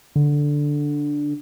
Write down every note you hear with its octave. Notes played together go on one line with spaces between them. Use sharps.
D3